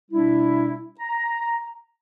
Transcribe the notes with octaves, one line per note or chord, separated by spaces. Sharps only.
B2 G3 D4 E4
A#5